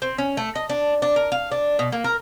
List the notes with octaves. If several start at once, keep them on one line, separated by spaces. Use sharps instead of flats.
C4
C#4
A3
D#5
D4
D4
A#4
F5
D4
B2
A#3
A#4